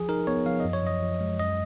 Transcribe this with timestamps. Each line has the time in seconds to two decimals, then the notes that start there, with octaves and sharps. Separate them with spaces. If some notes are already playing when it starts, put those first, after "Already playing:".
Already playing: F3 G#4
0.09 D#4 A#4
0.27 B3 C#5
0.46 F3 F5
0.60 F#2 D#5
0.73 C#5
0.84 F#2 D#5
1.02 F3
1.21 G#3
1.39 F#2 D#5